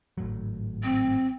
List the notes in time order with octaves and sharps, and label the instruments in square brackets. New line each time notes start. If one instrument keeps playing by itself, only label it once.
[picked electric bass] G#1 A2 F#3
[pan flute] C4